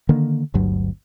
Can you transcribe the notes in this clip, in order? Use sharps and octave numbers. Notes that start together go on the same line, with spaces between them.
D3 D#3 A#3
G1 D2 G2 F#3